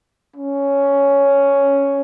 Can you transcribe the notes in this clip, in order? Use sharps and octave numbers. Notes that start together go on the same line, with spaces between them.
C#4